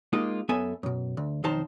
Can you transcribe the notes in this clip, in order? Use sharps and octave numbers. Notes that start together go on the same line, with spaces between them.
G#3 A#3 D#4 F4 G4
F#2 B3 A4 E5 G#5
F#2 B2
D2
B1 F2 D#3 D#4 C5 A5